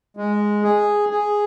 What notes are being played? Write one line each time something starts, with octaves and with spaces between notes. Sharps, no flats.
G#3
G#4
G#4